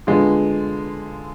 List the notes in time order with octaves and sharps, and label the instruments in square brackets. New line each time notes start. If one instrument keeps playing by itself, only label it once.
[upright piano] D3 G#3 B3 F4